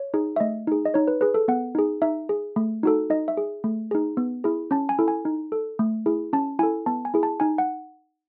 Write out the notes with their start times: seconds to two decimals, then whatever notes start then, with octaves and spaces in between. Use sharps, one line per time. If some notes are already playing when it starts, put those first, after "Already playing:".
Already playing: C#5
0.14 D#4 G#4
0.36 E5
0.40 A3 D#5
0.67 D#4 G#4
0.85 D#5
0.94 D#4 C#5
1.08 B4
1.21 G#4 B4
1.34 A4
1.48 B3 F#5
1.75 D#4 G#4
2.02 D#4 E5
2.29 G#4
2.56 A3
2.83 D#4 F#4 A4
3.10 D#4 D#5
3.28 E5
3.37 G#4
3.64 A3
3.91 D#4 G#4
4.17 B3
4.44 E4 G#4
4.71 C#4 A5
4.89 G#5
4.99 E4 A4
5.08 G#5
5.25 D#4
5.52 A4
5.79 A3
6.06 E4 G#4
6.33 C#4 A5
6.59 E4 A4 G#5
6.86 B3 A5
7.05 G#5
7.14 E4 G#4
7.23 A5
7.40 D#4 G#5
7.58 F#5